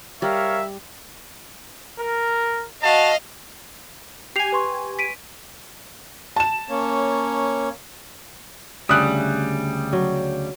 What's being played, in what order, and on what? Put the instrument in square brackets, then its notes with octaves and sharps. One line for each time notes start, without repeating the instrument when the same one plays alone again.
[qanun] G3 [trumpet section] A#4 C#5 F5 [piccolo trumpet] E5
[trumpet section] A#4
[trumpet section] F#4 A5 [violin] D#5 F5
[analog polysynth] G4 G#5 [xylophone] C7 F7
[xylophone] B4 C6 C#6
B6 D7 D#7
[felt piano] A5 E7
[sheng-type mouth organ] A#3 C#4 C#5
[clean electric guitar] D2 C#3 G3 [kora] E5 [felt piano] D#6 F#6
[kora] F#3